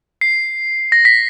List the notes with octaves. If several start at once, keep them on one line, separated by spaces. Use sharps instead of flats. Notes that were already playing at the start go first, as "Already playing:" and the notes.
C7
A#6
B6